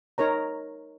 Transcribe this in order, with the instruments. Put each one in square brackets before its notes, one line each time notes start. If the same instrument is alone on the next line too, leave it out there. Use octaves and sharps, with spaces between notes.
[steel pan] D#4 A#4 C#5 A#5